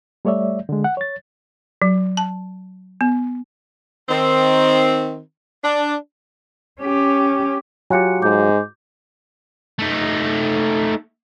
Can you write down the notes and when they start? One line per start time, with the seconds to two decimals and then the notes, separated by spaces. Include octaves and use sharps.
0.25 G3 A3 C#5 D5 E5
0.69 D3 G#3
0.84 F#5
0.97 C#5 A6
1.82 F#3
2.17 A5
3.01 B3
4.09 D#3 C4
5.63 D4
6.80 C#4 G4
7.90 F#3 F4 G4 G#5 F#6 C#7
8.22 G#2 D6 G6
9.79 A3 D#4